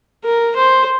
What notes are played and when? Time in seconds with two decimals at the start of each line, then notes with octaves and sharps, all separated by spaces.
0.24 A#4
0.56 C5